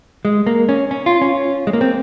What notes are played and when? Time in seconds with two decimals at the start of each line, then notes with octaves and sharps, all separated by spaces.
0.25 G#3
0.47 A#3
0.69 C#4
0.91 C#4
1.06 F4
1.21 C#4
1.67 G#3
1.73 A#3
1.81 C4